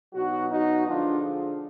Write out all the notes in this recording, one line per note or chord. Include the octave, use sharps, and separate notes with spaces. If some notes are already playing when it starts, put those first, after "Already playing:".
B2 F#3 D#4 F#4
D#4 F#4
D3 F3 G#3 D4 F4